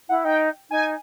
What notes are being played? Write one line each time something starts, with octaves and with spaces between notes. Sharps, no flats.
E4 F#5
D#4 G5
D#4 G#5